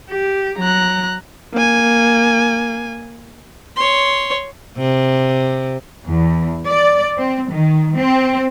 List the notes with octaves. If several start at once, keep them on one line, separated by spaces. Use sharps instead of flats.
G4
F#3 A#5 F#6
A#3 G#5
C#5 C6
C3
E2
D5
C4
D#3
C4